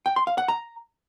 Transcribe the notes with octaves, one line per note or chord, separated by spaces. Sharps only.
G5
C6
F5
F#5
A#5